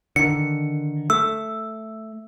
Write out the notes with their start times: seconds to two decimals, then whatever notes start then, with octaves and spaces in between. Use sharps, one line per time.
0.16 D3 D#3 C#7
1.10 A3 E6